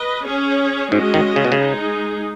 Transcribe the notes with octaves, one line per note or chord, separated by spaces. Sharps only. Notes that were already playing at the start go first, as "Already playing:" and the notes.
Already playing: B4 D#5
C#4 G#4 C#5
G#2 G#3 C#4 F#4 D#5
D#3
C#3
B2
C#3
G#3 D#4 G#4